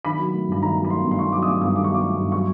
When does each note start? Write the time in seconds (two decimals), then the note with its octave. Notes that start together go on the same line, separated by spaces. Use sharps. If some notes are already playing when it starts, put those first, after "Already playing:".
0.05 D#3 B5
0.19 F#3
0.34 A3
0.48 G2 B5
0.62 D#3 A#5
0.76 F#3
0.84 B5
0.90 A3 C6
1.05 G2
1.11 C6
1.19 D#3 C#6
1.32 F#3 D6
1.42 D#6
1.47 A3 D6
1.61 G2 D#6
1.76 D#3 D6
1.84 C#6
1.90 F#3 D6
2.04 A3
2.18 G2
2.32 F#3 C#6